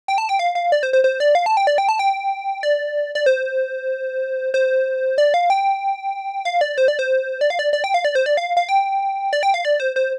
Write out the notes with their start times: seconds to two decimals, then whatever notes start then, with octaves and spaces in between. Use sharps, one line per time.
0.08 G5
0.18 A5
0.29 G5
0.39 F5
0.55 F5
0.72 D5
0.83 C5
0.93 C5
1.04 C5
1.20 D5
1.35 F5
1.46 A5
1.57 G5
1.67 D5
1.78 G5
1.89 A5
1.99 G5
2.63 D5
3.15 D5
3.26 C5
4.54 C5
5.18 D5
5.34 F5
5.50 G5
6.45 F5
6.61 D5
6.78 C5
6.88 D5
6.99 C5
7.41 D5
7.50 F5
7.59 D5
7.73 D5
7.84 G5
7.94 F5
8.05 D5
8.15 C5
8.26 D5
8.37 F5
8.57 F5
8.69 G5
9.33 D5
9.43 G5
9.54 F5
9.65 D5
9.80 C5
9.96 C5